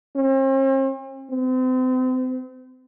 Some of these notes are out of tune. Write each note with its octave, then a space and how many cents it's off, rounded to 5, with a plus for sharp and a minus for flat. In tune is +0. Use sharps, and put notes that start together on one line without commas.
C4 +45
C4 -35